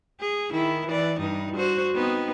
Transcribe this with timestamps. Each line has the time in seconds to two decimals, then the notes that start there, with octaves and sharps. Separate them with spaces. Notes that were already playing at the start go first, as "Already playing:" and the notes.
0.21 G#4
0.51 D#3 E4
0.87 E3 D5
1.20 G2 D#4
1.56 F#4 C5
1.94 B3 C4 D#4